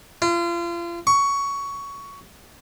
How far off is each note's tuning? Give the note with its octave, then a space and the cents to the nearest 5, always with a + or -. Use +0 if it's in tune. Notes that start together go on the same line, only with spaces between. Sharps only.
F4 -35
C#6 +15